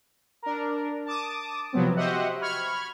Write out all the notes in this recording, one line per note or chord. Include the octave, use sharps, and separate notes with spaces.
D4 A#4
A5 D6 D#6
C3 F3 F#3 B3 C4
F#4 G4 C5 D#5 E5 F#5
B5 C#6 F6 G#6